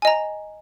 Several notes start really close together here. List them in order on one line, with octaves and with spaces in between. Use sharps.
G#5 D#5 A#5